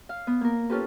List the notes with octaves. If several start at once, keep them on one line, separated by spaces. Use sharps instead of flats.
F5
B3
A#3 A#4
C#4 F4 G4 A4 B4